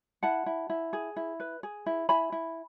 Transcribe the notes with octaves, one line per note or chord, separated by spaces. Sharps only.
E4 F#5 A5
E4
E4
G#4
E4
B4
G#4
E4
E4 G#5 B5
E4